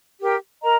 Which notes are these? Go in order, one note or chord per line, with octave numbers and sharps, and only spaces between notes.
G4 A#4 G5
A#4 D#5 A#5